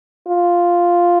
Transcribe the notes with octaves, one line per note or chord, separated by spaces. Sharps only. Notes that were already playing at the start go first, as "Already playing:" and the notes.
F4